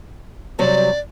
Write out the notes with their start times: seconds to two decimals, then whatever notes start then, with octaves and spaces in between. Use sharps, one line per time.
0.59 C3 F#3 G3 D5